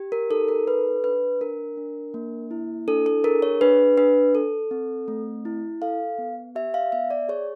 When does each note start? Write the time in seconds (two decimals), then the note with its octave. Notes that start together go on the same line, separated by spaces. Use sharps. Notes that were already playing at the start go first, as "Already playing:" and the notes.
Already playing: G4
0.12 A#4
0.31 D#4 A4
0.48 A#4
0.67 A4 B4
1.04 D4 B4
1.41 D4 A#4
1.77 D4
2.14 A#3
2.51 E4
2.88 D4 A4
3.06 A4
3.24 G#4 A#4
3.42 C#5
3.61 D4 B4
3.98 D4 B4
4.35 A4
4.71 C4
5.08 A3
5.45 E4
5.82 A4 F5
6.18 B3
6.55 G4 E5
6.74 F5
6.92 B3 E5
7.10 D5
7.29 G#4 C#5